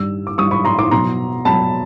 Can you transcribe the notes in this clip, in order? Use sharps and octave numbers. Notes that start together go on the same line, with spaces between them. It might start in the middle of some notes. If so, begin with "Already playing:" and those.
Already playing: G2 D#3 G3 E6
D6
G2 D#3 G3 C#6 D#6
B5 C#6
A#5 C6
C6 D6
B2 F#3 A#5 C6
B2 F#3 A5 B5